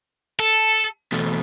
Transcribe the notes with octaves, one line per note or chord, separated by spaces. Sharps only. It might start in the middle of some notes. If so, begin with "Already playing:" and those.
A4
E2 B2 A3